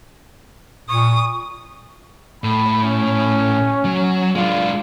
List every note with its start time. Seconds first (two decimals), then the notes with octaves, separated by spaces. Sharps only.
0.89 A#2 C#6 D#6
2.44 A2 B5
2.83 C#4
3.85 F#3
4.36 G#3 D4 F4